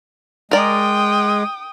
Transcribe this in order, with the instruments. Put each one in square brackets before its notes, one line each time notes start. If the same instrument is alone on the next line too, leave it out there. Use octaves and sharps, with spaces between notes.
[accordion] G#3 [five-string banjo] A#4 D5 [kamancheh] G5 D#6